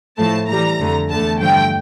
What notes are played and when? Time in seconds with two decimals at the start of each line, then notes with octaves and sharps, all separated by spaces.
0.17 A2 F3 A3 A5
0.48 A2 E3 G3 A#5
0.79 F2 D3 A3
1.10 E2 D3 A3 A5
1.41 G2 D3 F3 A3 G5